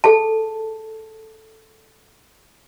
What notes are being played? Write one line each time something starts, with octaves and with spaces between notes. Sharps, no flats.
G#4 A4 A5